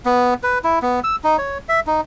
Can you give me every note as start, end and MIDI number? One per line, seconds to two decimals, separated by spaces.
0.06 0.34 59
0.43 0.59 71
0.64 0.79 64
0.82 1.00 59
1.04 1.16 88
1.24 1.37 63
1.38 1.58 73
1.69 1.80 76
1.87 2.01 63